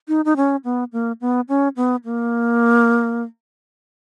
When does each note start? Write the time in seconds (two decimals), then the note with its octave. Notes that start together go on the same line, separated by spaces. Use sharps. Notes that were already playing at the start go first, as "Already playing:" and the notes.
0.08 D#4
0.25 D#4
0.37 C#4
0.64 B3
0.93 A#3
1.21 B3
1.49 C#4
1.76 B3
2.05 A#3